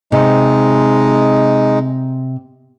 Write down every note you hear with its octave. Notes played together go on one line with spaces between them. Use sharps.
C3 G#3 D#4